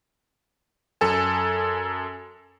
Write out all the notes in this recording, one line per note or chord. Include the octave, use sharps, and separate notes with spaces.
F#2 A4 G#5